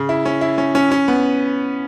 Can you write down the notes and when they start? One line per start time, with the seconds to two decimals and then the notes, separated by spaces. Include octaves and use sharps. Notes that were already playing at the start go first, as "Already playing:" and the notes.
Already playing: C#3
0.09 E4
0.25 C#4
0.41 E4
0.58 C#4
0.75 C#4
0.91 C#4
1.08 B3